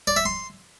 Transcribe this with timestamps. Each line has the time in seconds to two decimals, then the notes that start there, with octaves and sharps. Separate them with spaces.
0.07 D5
0.16 E5
0.25 C6